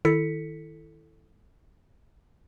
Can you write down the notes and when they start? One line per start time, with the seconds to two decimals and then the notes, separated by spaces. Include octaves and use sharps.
0.05 D#3 E4 A4 B6 C#7